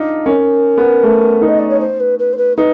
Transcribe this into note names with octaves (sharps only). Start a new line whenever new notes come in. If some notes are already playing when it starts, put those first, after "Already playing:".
Already playing: D4 D#4 F4
C#4 A#4
B3
A3
D#4
D#5
D5
C#5
C5
B4
B4
C5
B4
D#4 B4